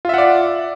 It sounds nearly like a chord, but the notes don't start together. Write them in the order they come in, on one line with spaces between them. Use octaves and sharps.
F4 E5 F#5 D5